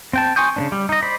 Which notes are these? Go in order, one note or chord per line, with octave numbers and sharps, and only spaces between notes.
C4 G5 A5
G#5 C6 C#6 D#6 G6
C#3 B3 D4
G3
D#4 D#5
C5 D5 B5